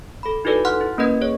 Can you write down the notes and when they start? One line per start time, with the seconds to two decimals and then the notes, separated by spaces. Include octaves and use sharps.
0.23 A4 B5
0.45 D#4 E4 F#4 A4 B4 D5
0.65 F#5 C6 F6 F#6
0.81 E4
0.98 A#3 C#4 A#4 B4 D#5 G#6
1.21 G#4 C#5